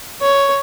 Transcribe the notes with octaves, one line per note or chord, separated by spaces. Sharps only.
C#5